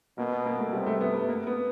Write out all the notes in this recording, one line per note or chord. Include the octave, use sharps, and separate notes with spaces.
B2 A#3
B3
A#3
A3
C3 G3
A3
B3
B3
A#3
B3